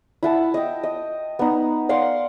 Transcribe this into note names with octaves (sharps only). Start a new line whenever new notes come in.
E4 F#5 A5
D#5 G5
D#5
B3 D#4
D5 F5 F#5 C6